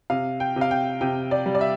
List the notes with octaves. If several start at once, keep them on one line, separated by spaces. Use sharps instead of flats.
C3 F5
G5
C3
F5
G5
C3 G5
D5
G3
D5
E5